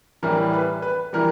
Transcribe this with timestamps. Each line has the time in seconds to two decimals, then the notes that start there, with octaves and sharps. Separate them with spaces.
0.23 A2 E3 G3 A#4
0.53 B4
0.82 B4
1.13 E3 G3 A#4